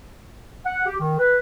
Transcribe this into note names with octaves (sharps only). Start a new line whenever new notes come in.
F#5
G4
D#3
B4